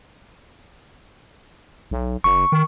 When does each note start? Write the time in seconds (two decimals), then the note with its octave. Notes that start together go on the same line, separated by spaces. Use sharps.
1.91 B1
2.24 F#1 C#6
2.52 D#3